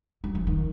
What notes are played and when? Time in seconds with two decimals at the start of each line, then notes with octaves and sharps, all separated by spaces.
0.24 F#3
0.35 F3
0.47 D#3